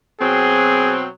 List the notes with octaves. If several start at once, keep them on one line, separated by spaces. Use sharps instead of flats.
B2 F#3 C4 G#4